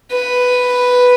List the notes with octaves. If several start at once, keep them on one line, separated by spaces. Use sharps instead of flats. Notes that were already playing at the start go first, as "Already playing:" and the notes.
B4